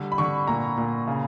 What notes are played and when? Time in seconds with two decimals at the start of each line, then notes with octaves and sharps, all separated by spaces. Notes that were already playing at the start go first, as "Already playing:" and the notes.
Already playing: D3 G3
0.12 B5
0.18 D3 C#6
0.47 A#2 A#5
0.77 A#2
1.07 C#3